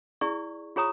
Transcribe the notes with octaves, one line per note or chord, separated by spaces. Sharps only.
E4 G#4 D5 C#6
F4 G#4 C#5 A#5 D#6